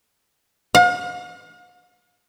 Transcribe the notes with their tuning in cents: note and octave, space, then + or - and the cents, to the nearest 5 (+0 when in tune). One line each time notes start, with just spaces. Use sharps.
F5 +45